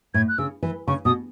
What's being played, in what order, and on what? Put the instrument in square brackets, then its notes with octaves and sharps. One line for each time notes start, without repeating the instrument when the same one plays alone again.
[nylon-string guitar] A2 [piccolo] G#6
[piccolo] F#6
[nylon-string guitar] C#3 [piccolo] E6
[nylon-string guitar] E3
[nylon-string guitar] C#3 [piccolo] C#6
[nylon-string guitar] B2 [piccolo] D#6